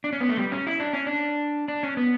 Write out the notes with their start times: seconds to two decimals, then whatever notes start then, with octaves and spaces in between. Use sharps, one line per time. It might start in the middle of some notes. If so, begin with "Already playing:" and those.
0.04 D4
0.13 C#4
0.21 B3
0.29 A3
0.37 G3
0.52 C#4
0.67 E4
0.80 D4
0.93 C#4
1.07 D4
1.68 D4
1.83 C#4
1.97 B3